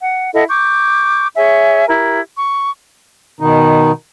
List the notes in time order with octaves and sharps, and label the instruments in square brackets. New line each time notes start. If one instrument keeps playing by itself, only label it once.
[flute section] F#5
E4 A4 D#5 F#5
C#6 D6 G6
G#4 C#5 E5 G#5
E4 G4 A#4
C#6
[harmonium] B2 D#3 D#4